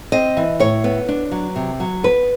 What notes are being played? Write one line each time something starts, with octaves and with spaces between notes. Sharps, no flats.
C4 D#5
E3
A2 C#5
B3
D4
F#3
C3
F#3
B3 B4